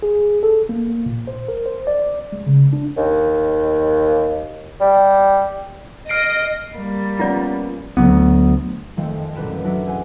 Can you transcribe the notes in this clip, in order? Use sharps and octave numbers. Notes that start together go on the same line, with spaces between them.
G#4
A4
A#3
A#2
C5
A#4
C5
D5
G#3
C#3
D4
D#2
G3
D#5 F6 C7 D7
G3 A#3
F3 B3 C#4 F4 D5
D2 F#3 A#3 B3
F2 D#3 F3 G#3 A3 C4
A1 F#2 A#2 B4 E7
F#3 D4 F#4 E5
G#4 A4 C5 F#5 G#5